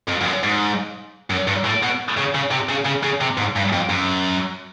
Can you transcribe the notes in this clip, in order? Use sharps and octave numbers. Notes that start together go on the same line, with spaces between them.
F2
F2
F#2
G#2
F#2
G2
A2
B2
C#3
C#3
C3
C#3
C#3
C#3
C3
G#2
G2
F2
F#2